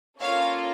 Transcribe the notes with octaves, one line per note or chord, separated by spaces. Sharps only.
A#3 C#4 F4 A4 C#5 F5